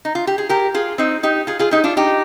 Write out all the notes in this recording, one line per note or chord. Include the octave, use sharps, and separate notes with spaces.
D#4
F4
G4
G#4
G4 A#4
F4 G#4
C4 D#4
D#4 G4
F4 G#4
F4 G#4
D#4 G4
D4 F4
D#4 G4